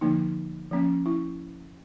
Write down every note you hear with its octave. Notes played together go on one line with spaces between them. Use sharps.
D3 F3 A#3 D#4
F3 A#3 C#4
E4